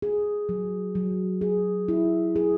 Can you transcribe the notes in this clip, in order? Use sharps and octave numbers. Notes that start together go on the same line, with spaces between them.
G#4
F#3
F#3
G#4
E4
G#4